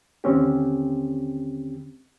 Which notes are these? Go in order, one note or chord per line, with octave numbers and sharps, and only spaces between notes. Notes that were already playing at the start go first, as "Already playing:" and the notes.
D#2 D3 C4 C#4 G4